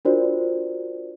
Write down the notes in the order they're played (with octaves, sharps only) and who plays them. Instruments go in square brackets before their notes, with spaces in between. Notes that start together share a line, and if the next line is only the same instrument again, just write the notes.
[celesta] D4 F4 F#4 A#4 C5 D5